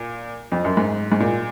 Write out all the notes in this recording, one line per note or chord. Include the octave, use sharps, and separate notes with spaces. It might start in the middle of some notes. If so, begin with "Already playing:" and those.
Already playing: A#2
F2
F#2
G#2
G#2
A#2